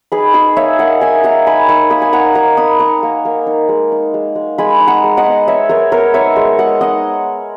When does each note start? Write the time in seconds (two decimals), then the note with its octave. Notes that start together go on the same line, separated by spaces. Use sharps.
0.12 D#4 G#4 B4
0.34 D#4 G#4
0.56 A#3 C#5 E5
0.79 A#3 D#5 F#5
1.01 D#4 E5 G#5
1.24 A#3 F#5 A#5
1.46 D#4 G#5 B5
1.68 D#4 C#6 E6
1.90 A#3 B5 D#6
2.02 G#5
2.13 D#4 F#5 A#5
2.35 D#4 F#5 A#5
2.57 D#4 B5 D#6
2.79 D#4 A#5 C#6
3.03 A#3
3.25 A#3
3.47 D#4
3.69 G#3
3.92 D#4
4.14 G#3
4.36 G#3
4.58 G#3 G#5 B5
4.80 D#4
4.88 F#5 A#5
5.04 G#3
5.17 D#5 F#5
5.26 B3
5.48 B3 C#5 E5
5.69 G#3 A#4 C#5
5.92 B3 A#4 C#5
6.14 D#4 C#5 E5
6.36 G#3
6.59 G#3 D#5 F#5
6.81 D#4 D#5 F#5